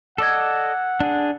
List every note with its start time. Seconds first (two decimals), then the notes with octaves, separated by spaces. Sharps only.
0.18 A4 D5 D#5 F#5 E6 G#6
1.00 D4 G#4